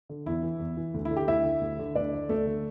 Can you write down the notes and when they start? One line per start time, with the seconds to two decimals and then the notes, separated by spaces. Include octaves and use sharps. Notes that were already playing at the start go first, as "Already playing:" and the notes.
0.09 D3
0.26 E2 E4
0.43 E3
0.60 E2
0.77 E3
0.94 D2
1.05 E4
1.11 D3
1.17 G4
1.28 D2 E4 E5
1.45 D3
1.61 D2
1.79 D3
1.95 D2 D4 D5
2.13 D3
2.29 D2 A3 A4
2.46 D3